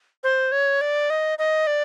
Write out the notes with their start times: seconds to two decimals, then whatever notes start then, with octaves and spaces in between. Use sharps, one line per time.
0.24 C5
0.52 C#5
0.81 D5
1.10 D#5
1.38 D#5
1.67 D5